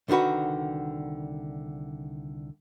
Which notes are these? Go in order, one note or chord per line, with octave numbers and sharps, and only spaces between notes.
C2 D3 D#3 F#4 B4